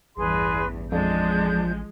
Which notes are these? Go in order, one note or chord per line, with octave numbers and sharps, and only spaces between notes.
A1 E2 G2 G#4 B4 C6
F2 F3 G#3 D4 G6